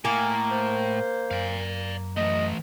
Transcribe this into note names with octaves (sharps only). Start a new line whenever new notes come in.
A2 A#3 G#5
C5
F#2 D5 F5
E3 A3 D#5